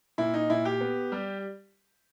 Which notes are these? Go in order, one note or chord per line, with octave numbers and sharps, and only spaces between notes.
A#2 E4
D#4
A#2 E4
G4
B3
G3